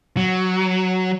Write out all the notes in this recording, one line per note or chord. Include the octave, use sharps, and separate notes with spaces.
F#3